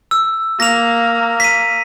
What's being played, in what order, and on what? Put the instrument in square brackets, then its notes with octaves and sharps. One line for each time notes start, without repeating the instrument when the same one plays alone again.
[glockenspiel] E6
[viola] A#3 [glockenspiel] A#6 F7
[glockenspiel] B6 D#7